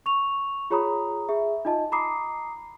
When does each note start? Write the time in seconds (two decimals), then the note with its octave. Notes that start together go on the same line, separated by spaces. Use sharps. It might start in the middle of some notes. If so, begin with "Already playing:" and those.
0.06 C#6 F7
0.70 F4 G#4 C#5 A#5 B5 D#6
1.29 G#4 E5
1.65 D#4 F4 D#5 A5
1.92 A#5 B5 D6 D#6 C7